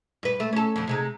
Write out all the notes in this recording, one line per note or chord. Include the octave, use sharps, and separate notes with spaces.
G2 B4
A3
C#4 A4
F2 D3
C3 G#3 D#4